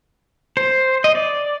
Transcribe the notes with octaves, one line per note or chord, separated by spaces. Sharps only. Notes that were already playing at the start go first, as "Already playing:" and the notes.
C5
D#5
D5